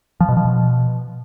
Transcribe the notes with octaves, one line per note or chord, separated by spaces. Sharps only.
F3
B2
F3
B2